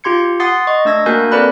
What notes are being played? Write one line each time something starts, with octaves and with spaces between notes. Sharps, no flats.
F4 G4 C6 G#6 C#7
F#5 C6 D#6 A6 C7
D#5 C#6
A3 D4 E6 G#6 A#6
A#3 F#4 A#4 G#5 F#6 G6
C4 A4 B4 D5 B5 F#6